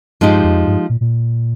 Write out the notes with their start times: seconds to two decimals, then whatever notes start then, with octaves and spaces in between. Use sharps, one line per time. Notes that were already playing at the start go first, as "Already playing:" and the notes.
0.21 G2 F3 G#3 D#4 G4
0.44 F2
0.67 G2
0.89 A#2
1.01 A#2